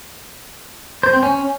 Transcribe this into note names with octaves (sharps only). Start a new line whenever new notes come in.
C5
C4
C#4